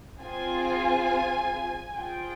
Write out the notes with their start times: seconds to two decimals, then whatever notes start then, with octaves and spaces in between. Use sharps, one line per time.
0.22 C4 F4 G#4 G#5
1.96 C4 F4 G#4 G5